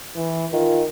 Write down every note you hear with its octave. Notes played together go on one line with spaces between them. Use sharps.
E3
D#3 F4